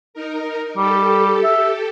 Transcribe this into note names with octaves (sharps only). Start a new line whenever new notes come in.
D#4 A#4
G3 G4 A4
E5